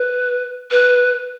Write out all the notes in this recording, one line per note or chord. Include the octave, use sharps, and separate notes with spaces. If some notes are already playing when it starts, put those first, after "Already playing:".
Already playing: B4
B4